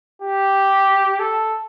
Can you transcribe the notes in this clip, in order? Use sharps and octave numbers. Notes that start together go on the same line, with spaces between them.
G4
A4